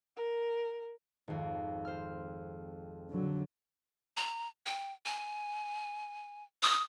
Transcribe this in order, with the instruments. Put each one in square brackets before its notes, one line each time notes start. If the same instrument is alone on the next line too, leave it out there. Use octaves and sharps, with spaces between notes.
[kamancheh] A#4
[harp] G#1 F2
C5 F6
[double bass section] D3 F#3
[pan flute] A#5
G5
G#5
D#6